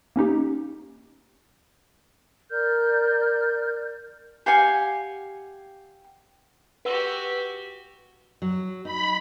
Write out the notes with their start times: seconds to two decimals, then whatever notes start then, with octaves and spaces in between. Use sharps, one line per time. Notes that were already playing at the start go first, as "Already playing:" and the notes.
0.16 A#3 C#4 D#4 G4
2.50 A#4 D5 F6 G6
4.46 G4 F5 F#5 G#5
6.85 F#4 G4 B4 F#5 E6
8.42 F#3
8.85 D#4 B5